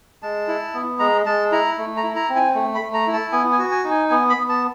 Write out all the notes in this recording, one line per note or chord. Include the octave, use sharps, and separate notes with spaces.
G#3 A5
E4
B3
G#3 A#5
G#3 A5
E4 A#5
A3
A#5
E4
A#5
C4
G#5
A3
B5
A3
A#5
E4
A5
B3 G#5
G#5
F#4
G#5
D#4
G#5
B3 G#5
B5
B3
A5